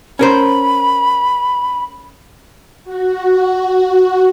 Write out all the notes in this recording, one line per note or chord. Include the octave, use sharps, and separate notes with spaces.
C#4 A#4 C5 B5
F#4